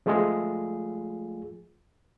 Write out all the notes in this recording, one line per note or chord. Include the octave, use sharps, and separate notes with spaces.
F3 G#3 A3 F4 G#4